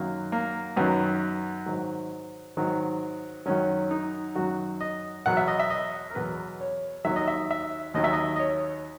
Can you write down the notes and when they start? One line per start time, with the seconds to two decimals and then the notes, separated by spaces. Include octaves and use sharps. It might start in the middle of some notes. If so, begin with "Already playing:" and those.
Already playing: F#2 D#3 F#3 A#3
0.32 A#3
0.76 F#2 D#3 F#3 B3
1.66 G#2 D#3 F#3
2.57 G#2 D#3 F#3
3.46 F#2 D#3 F#3 C#4
3.91 D#4
4.35 F#2 D#3 F#3 F#4
4.81 D#5
5.26 E2 B2 F#3 F#5
5.37 E5
5.48 D#5
5.59 E5
5.70 D#5
6.10 A#4
6.15 E2 B2 F#3 B4
6.61 C#5
7.05 D#2 D#3 F#3 E5
7.16 D#5
7.28 E5
7.51 E5
7.94 D#2 D#3 F#3 D#5
8.04 E5
8.13 D#5
8.36 D#5
8.40 C#5